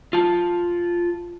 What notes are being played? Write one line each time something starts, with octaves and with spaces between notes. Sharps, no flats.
F4 A5